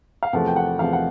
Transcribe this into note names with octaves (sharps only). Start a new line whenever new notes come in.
F5
E2 C3 F3 A3 F#5
G5
F#5
E2 C3 F3 A3 F5
F#5